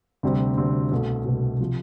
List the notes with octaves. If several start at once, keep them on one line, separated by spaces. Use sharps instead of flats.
D2 C3 G3 C4
D2 C3 G3 C4
C2 B2 A3
C2 B2 A3
C3 F3